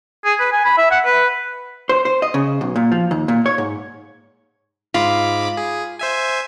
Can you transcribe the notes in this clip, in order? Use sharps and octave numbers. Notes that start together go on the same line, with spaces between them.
G#4
B4
G#5
B5
E5
F#5
B4
C5
C5
D#5
C#3
B1
A#2
F3
D#2
A#2
C#5
G#2
G#2 F4 B5 D6
G#4
C5 E5 G#5